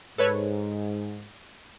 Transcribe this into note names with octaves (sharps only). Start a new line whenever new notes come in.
G#2 A4 B4 C#5